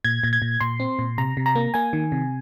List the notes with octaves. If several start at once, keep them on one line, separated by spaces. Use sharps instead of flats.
A#2 G#6
A#2
G#6
A#2
A#2 C6
C4
A#2
C3 A#5
C3
A#5
A#3
A#3 G#5
D#3
C3